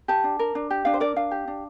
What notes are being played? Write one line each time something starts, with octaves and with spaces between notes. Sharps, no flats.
G4 A5
D4
A#4
D4
G4
D4 F5
C5
A#4 D5
D4 F5
G4
D4